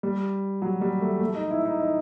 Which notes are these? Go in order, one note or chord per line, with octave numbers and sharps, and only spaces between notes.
G3
F#3
G3
A3
A3
D#4
E4
D#4
D#4